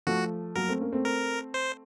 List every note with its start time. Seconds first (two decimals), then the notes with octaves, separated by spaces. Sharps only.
0.07 F3 A3 F#4
0.55 F#3 A#3 A#4
0.68 A3 C4
0.80 A#3 C#4
0.93 A3 C4
1.05 A#4
1.54 C5